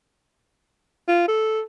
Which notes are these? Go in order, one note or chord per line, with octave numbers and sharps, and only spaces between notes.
F4
A4